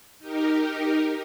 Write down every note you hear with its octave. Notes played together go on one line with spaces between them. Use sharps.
D#4 G4 A#4